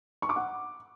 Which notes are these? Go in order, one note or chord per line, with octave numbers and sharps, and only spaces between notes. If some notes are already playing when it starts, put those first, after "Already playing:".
C#6
D6
F#5